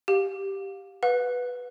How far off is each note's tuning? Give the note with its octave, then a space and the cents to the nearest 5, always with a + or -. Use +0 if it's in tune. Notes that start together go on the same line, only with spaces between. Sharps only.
G4 +0 F5 +30
B4 +0 F#5 -45